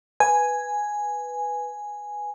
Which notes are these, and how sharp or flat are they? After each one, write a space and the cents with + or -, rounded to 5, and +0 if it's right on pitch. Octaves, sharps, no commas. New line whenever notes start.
B4 +0 G#5 +0